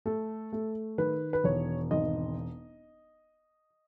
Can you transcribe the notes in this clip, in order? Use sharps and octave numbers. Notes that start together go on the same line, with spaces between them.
A3 A4
A3
D#3 B4
B4
E1 C#5
G#1 D#5